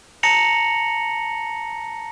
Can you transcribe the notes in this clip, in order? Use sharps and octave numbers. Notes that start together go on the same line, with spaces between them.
A5 A#5 A#6 C#7 F7 F#7